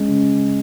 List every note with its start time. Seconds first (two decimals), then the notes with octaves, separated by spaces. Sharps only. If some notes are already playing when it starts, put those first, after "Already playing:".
Already playing: G#3 C#4
0.08 C#3